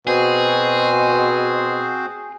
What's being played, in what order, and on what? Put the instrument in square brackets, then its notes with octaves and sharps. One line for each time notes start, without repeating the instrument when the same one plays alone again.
[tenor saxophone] B2 [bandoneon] C4 F#4 C5 [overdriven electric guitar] G#4